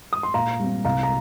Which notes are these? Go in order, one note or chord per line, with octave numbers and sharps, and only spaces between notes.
D#6
C6
A#2 F5 A#5
G3 C4
C2 F5 A#5
A#5